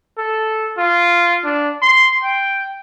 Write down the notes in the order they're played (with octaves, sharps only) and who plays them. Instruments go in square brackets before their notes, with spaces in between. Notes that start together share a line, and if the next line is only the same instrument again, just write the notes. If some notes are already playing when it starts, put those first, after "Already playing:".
[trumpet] A4
F4
D4
C6
G5